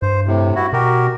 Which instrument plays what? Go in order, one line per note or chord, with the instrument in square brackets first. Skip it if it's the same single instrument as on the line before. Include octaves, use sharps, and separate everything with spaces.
[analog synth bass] G2 [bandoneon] C5
[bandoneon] A2 C3
G2 E4 F#4
[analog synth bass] B2 [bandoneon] F#4 G4 A#4